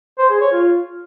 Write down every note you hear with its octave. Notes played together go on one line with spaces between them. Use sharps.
C5
G#4
C#5
F4